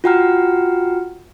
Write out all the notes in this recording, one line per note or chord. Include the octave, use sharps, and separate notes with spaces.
F4 F#4 F#5 G5 A#5 F6